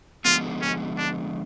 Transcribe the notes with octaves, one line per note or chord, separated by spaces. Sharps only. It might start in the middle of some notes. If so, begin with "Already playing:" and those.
D3 F3 G#3 B3 F4
C#4
D4